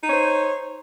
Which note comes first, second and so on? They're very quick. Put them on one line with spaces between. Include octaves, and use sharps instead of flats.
D#4 C#5 C5